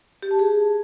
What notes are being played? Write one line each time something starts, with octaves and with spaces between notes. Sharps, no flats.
G4
A5
G#4